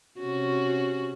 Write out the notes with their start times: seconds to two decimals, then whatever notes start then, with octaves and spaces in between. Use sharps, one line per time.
0.19 C3 C#4 F#4